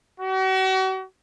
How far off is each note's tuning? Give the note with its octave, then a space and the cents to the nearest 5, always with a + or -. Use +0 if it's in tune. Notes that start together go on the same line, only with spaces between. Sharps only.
F#4 +40